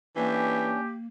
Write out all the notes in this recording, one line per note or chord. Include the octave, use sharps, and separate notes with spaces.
E3 A#3 C#4 D4 G4